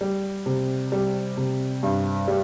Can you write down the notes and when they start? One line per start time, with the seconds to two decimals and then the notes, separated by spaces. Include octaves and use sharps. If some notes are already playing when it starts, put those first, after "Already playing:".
0.01 G3
0.46 C3
0.92 G3
1.37 C3
1.83 G2
2.28 G3